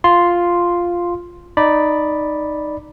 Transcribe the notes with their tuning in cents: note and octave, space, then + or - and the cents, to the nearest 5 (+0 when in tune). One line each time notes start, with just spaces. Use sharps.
F4 +0 C6 +0
D#4 -10 D5 +0 B5 -10